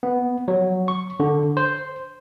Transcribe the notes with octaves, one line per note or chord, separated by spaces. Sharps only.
B3
F#3
C#6
D3
C5